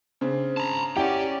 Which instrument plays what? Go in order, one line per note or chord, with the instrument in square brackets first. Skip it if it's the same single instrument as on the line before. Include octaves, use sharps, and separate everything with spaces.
[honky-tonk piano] C#3 C4 D4
[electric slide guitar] A5 A#5
[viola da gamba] C#4 D5 [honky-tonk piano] E4 F#5 [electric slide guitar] G4 [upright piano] G5